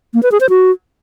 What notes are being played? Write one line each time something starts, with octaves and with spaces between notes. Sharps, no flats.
A#3
B4
G#4
C5
F#4